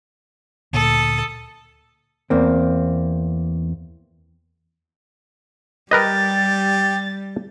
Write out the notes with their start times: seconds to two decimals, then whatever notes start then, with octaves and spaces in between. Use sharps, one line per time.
0.73 D2 A#2 A4 D#6
2.30 E2 A#3 C4
5.91 G3 G4 A#4 B4 D#5 A6